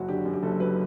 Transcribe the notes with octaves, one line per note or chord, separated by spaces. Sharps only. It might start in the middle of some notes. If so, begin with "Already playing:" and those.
Already playing: F#1 F#3 F#4
D3 G4
F#2
G4
F#1 A4
F#3 B4